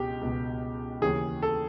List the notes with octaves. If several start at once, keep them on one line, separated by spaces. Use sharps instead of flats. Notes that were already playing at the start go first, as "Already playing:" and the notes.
Already playing: C#2 B2 G4
C#2 B2
D#2 C#3 E3 G#4
A4